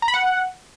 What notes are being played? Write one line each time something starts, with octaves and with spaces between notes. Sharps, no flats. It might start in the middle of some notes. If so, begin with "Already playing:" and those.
A#5
B5
F#5